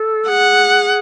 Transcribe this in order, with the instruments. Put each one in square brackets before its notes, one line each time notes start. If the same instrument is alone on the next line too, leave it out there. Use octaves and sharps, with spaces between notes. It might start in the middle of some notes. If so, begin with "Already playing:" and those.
Already playing: [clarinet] A4
[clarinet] G#4 [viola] F#5